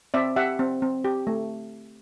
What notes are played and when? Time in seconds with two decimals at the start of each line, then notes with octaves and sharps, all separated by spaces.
0.14 C4 D5 E5
0.36 G4 E5 F#5
0.59 C4
0.82 C4
1.04 G4
1.27 A3